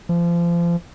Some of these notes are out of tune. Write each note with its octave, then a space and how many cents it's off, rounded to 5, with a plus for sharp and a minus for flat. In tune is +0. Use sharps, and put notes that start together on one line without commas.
F3 -30